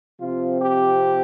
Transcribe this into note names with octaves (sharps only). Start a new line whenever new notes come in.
C3 F3 C4 F4
G4